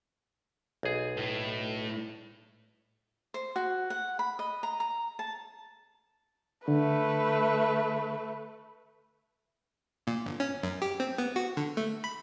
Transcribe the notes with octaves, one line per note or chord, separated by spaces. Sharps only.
B1 G#4
A2
C5
F#4
F#5
B5
D#5
A#5
A#5
A5
D3 A3 B4
A#2
G1
C#4
F#2
G4
C4
B3
F#4
D3
A3
B5